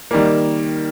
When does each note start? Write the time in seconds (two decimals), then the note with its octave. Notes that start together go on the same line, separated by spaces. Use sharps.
0.11 D#3 G3 A#3